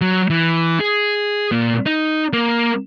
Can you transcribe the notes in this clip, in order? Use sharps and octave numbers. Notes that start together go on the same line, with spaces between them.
F#3
E3
G#4
A#2
D#4
A#3